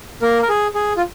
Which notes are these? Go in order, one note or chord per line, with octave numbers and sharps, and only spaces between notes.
A#3 A#4
A#4
G#4
G#4
F4